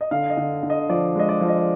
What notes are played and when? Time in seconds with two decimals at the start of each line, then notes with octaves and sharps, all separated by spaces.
0.01 D#5
0.11 D3 F5
0.30 D#5
0.37 D3
0.63 D3
0.70 D#5
0.89 F3 D5
1.16 G#3 D#5
1.29 D5
1.41 F3
1.48 D#5